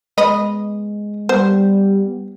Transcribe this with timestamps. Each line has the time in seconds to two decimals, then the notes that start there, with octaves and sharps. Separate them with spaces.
0.18 G#3 B3 D#5 B5
1.29 G3 B3 C5